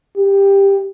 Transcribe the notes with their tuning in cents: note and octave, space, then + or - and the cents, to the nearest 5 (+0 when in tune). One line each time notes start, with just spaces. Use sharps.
G4 +10